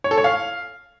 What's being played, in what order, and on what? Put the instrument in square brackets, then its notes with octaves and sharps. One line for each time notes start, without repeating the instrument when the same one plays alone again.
[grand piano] C#5
A4
C#5
F5